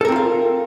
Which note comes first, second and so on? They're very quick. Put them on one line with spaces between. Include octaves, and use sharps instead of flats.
A4 A#4 C4 F4 F5